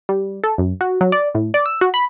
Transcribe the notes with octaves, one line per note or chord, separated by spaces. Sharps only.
G3
A4
F#2
F#4
F#3
D5
A2
D5
E6
F#4
B5